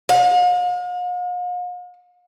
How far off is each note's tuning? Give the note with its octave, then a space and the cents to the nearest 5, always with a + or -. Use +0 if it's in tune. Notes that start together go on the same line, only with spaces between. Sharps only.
F5 +45